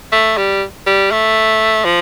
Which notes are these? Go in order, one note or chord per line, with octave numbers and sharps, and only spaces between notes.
A3
G3
G3
A3
F3